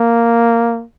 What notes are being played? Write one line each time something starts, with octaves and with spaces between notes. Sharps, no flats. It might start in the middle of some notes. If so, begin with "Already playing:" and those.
Already playing: A#3